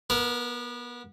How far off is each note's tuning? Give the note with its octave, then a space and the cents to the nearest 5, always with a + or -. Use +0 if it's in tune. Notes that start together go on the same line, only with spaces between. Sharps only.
B3 -30 A#4 +0